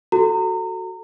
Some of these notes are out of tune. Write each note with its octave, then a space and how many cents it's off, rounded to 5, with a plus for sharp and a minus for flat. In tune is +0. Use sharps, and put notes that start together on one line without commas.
F#4 +0 A4 +0 A#5 -30